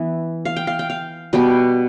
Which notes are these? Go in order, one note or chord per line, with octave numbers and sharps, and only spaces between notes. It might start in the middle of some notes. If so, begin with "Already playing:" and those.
Already playing: E3 B3 E5
F5
G5
F5
G5
F5
B2 G3 B3 G5